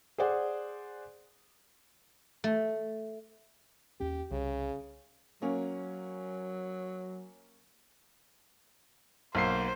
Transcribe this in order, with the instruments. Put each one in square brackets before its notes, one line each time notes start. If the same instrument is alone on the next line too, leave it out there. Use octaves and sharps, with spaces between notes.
[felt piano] G#4 C5 D5 F#5
[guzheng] A3
[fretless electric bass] D#2 C#4 [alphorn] G4
[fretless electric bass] C2 [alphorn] C#3
[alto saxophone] F#3 [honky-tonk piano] A#3 C#4
[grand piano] B1 A#3 C7 [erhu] C5